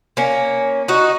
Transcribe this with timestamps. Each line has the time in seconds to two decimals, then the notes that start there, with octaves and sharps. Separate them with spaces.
0.17 A#3 C#4
0.88 D#4 F#4